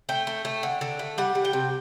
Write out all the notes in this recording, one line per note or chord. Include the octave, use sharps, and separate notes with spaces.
A3 G5
A3
A3
D3
D3
A3
G3 F#5
G3
G5
C3